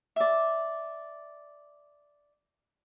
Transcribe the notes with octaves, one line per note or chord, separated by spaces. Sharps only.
D5 E5